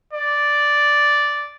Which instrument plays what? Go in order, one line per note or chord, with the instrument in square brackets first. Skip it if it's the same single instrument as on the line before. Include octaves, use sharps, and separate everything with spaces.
[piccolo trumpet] D5